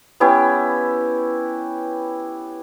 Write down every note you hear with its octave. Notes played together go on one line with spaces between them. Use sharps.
B3 C#4 E4 G4